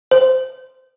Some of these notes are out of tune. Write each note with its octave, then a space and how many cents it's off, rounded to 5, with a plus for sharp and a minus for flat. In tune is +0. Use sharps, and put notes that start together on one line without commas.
C5 -15